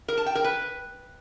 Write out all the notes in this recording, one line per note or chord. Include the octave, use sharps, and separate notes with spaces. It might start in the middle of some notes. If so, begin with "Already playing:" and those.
A#4
A5
G5
A#4
B4